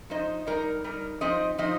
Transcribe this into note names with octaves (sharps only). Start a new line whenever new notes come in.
F3 D#4 C5 D#5
G3 D#4 A#4
G3 D#4 A#4
F3 C4 D#4 C5 D#5
F3 C4 D#4 C5 D#5